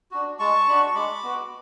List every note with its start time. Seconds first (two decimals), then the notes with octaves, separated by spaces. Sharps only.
0.11 D4 F#4
0.39 G#3 A5 C#6
0.67 D4 F#4 B5
0.83 C#6
0.95 G#3 B5 D6
1.23 B3 F#4